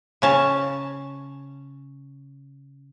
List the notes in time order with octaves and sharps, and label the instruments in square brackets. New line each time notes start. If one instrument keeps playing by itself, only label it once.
[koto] C#3 C#4 A5